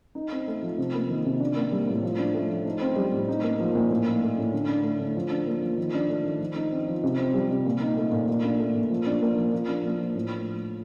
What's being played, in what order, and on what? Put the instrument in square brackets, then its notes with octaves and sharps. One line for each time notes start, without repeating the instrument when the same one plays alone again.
[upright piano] D#4
C4
A3
F3
C3
A#3
D#3
C3
D4
A#3
G3
A2
F3
D4
A3
F3
D#4
C4
G3
A2
D#4
A#3
F3
A#2
A2
D#4
A3
A2
D3
D4
A3
D3
F3
D4
A#3
F3
D#3
D4
A3
D#3
F3
D#4
C4
F3
C3
C4
G3
C3
A#2
D#4
A3
A#2
A#2
D4
A3
A#2
F3
D4
A#3
F3
F3
D4
A#3
F3
A2